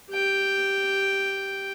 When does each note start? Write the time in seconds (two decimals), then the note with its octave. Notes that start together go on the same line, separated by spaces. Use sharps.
0.10 G4 G5